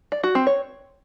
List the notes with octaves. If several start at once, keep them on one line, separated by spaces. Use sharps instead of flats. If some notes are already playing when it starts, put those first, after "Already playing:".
D5
F#4
C4
C#5